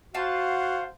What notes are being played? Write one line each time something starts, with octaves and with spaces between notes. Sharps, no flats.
F4 F#4 C5 F5 F#5 A5